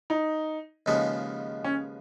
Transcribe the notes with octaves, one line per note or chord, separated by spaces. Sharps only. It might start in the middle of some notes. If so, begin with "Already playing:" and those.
D#4
D#2 C#3 F3 G#3 B3
C#4